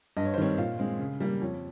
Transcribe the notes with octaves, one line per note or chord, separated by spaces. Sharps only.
G2 D#5
C#5
C5
D#3 G3 C4 C#5
A#2 F5
G#3 C4
C#3
G3 A#3
F2 C#5